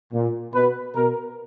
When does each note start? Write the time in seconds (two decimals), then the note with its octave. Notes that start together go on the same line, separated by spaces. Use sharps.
0.12 A#2
0.54 B2 B4
0.94 B2 A#4